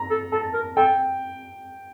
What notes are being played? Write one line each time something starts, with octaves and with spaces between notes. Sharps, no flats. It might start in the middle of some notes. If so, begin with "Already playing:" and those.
Already playing: A#5
A4
A4 A5
A#4
A4 G5